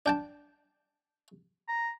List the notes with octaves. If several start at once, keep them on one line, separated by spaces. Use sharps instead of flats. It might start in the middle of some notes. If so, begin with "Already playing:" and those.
D4 G5 A5
A#5